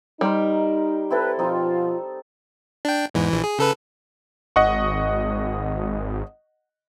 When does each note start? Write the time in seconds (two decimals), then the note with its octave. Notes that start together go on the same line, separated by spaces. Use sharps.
0.21 G3 D#4 G4 A#4 C5
1.10 C4 E4 A4 B4
1.39 B2 F3 C4 D#4 F4
2.85 D4 G5
3.14 E2 G#2 E3
3.30 A#1 E3
3.44 G#4
3.58 C#3 A4 B4
4.56 G#1 D#5 F#5 C#6